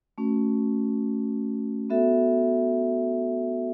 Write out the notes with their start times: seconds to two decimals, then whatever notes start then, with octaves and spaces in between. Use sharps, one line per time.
0.18 A3 C#4 F#4
1.90 B3 F#4 A4 E5